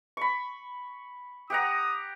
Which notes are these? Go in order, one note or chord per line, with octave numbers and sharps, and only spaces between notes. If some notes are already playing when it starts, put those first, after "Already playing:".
B5 C#6
G4 F#5 A#5 D#6